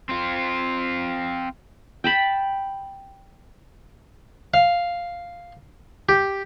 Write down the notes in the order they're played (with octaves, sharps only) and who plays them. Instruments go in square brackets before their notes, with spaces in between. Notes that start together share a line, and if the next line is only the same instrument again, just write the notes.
[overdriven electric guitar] C4 F4
[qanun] G5 A5 B5
[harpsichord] F5
G4